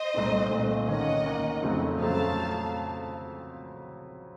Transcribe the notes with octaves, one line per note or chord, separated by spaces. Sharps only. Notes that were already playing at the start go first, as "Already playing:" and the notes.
Already playing: C5 D#5
C2 A#2 A3 C4 D#4
C2 A#2 A3 C4 D#4
D#2 D#3 A#3 C#4 D#5 F#5
D#2 D#3 A#3 C#4
F2 C#3 F#3 A3 C4
F2 C#3 F#3 A3 C4 F5 A5